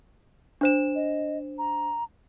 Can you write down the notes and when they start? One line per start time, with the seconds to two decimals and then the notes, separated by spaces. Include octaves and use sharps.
0.61 D4 C5 E7
0.95 D#5
1.58 A#5